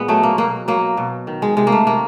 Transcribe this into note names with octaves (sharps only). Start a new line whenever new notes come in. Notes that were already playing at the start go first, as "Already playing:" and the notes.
Already playing: A#2 G#3 B3
F#3 A3
A#3
B2 A#3
F#3 A#3
B2
D#3
G#3
C3 G#3
A#3
A3
C3 A#3